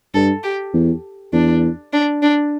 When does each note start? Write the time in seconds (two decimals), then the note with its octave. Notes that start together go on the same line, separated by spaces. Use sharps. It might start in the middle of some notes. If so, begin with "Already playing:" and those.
0.14 G2 A4
0.43 G4
0.74 E2
1.33 E2 D4
1.93 D4
2.22 D4